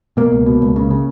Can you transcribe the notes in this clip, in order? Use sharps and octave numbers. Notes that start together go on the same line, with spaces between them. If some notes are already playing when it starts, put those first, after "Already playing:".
B2 A#3
C#2
B2
C#2
C#3
C#3